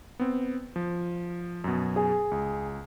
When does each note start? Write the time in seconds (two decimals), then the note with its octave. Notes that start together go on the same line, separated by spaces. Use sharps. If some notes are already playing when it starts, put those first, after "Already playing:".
0.19 B3 C4
0.76 F3
1.64 F#2 B2
1.96 G#4
2.31 C#2